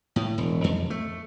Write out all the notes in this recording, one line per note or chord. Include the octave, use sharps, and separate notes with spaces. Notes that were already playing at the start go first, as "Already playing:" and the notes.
A2
E1
F2
A3